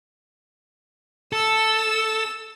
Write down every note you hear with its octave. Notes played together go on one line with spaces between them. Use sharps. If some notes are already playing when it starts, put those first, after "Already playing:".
A4 E6